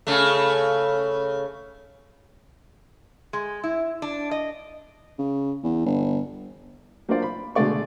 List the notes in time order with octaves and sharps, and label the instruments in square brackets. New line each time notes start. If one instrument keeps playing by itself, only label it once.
[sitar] C#3 A3
[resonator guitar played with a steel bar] G#3
E4
D4
D#5
[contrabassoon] C#3
E2
G1
[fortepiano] F#3 A#3 D4 F4 C5 D5
B5
B2 D3 G#3 A3 D5 C#6